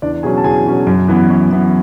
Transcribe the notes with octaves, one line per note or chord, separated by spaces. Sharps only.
E2 D4 D5
B2 F#3 C#4 G#4 G#5
A5
E2 G#4 G#5
B2 F#3 C#4
F#2
E3 B3
F#2
E3 B3